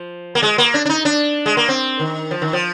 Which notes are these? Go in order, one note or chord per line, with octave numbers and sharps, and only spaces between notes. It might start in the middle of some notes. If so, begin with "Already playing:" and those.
Already playing: F3
A#3
G#3
A#3
D4
D4
D#4
D4
G#3
A#3
C4
D#3
F3
D#3
F3